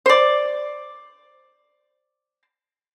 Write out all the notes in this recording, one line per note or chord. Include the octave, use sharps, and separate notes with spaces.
C5 D5